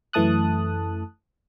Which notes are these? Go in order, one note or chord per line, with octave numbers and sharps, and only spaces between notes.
F#2 E3 A3 A5 D#6 F#6